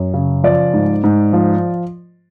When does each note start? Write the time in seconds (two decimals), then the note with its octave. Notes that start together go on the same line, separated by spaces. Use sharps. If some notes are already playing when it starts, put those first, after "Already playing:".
Already playing: F#2
0.14 C#3
0.44 F3 D5
0.74 G#2
1.04 G#2
1.33 F3